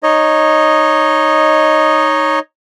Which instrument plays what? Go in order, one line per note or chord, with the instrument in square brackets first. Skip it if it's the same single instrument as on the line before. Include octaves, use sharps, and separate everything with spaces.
[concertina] D#4 C#5 D#5